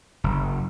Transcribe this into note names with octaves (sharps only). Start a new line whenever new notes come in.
F#1